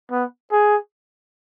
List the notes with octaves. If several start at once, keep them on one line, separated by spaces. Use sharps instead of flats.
B3
G#4